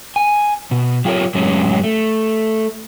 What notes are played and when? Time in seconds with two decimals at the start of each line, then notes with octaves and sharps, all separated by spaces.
0.16 G#5
0.71 B2
1.05 F#3 F4 G4 G#4 A#4 C#5
1.35 F#2 A2 F#3 G#3 C#4
1.84 A3